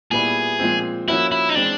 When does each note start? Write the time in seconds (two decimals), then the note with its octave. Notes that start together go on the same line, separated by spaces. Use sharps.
0.11 A#2 G3 B3 E4 G#4
0.59 A#2 F3 G#3 C4
1.08 F3 A#3 C#4 E4 F#4
1.32 E4
1.49 D#4
1.55 E3 G#3 C4 D4